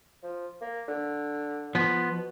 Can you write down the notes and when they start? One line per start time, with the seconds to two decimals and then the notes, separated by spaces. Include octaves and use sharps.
0.23 F3
0.61 A#3
0.88 D3
1.75 F3 B3
2.14 B2